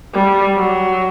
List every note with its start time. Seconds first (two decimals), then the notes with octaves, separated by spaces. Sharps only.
0.13 G3
0.57 F#3